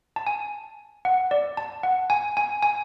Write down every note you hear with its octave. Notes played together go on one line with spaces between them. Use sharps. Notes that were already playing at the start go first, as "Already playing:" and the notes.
A5
G#5
F#5
D5
A5
F#5
G#5
G#5
G#5